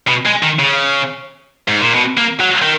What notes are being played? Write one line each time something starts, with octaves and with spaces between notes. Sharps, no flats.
B2
G#3
D#3
C#3
G#2
A#2
B2
A#3
F#3
D#3